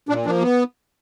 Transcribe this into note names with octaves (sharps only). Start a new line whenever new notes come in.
A#2 D4
F3 A#3 D4
B3